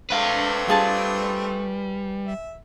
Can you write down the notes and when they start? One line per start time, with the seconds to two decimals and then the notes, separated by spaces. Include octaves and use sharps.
0.10 A3 C4 D4 B4 F5
0.68 G3 F4 G#4 A5
2.27 E5